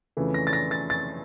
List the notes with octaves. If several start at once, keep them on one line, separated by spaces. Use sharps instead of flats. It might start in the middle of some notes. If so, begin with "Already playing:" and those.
F2 C#3 E3 A3
A#6
A6
A#6
A6
A6